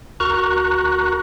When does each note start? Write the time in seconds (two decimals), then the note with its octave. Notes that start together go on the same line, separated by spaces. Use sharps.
0.20 D2 F#4 A#4 A#5 C#6 F#6